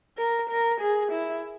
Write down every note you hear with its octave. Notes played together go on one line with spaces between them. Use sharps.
A#4
A#4
G#4
E4